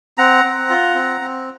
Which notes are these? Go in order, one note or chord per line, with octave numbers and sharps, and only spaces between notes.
C4 F#5 A#5
C4
F4
C4
C4